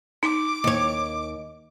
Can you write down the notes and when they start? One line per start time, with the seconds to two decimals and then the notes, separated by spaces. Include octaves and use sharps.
0.23 D#4 D6
0.64 D#2 C#5